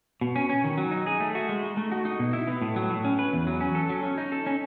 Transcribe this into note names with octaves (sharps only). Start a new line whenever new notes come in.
B2
C#4
C#4
D#3
F#3
D#4
G#4
A3
F#4
G#3
D#4
A3
F#4
D#4
B2
E4
B3
A2
F#3
A2
C#4
B4
E2
F#3
C#4
A4
F#3
C#4
D#4
A4
C#4